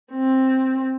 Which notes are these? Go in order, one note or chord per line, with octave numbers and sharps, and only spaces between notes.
C4